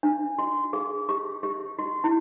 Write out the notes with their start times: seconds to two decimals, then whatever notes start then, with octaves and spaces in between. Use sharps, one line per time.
0.03 D4
0.38 F#4
0.73 G#4
1.09 G4
1.43 G4
1.79 F#4
2.04 E4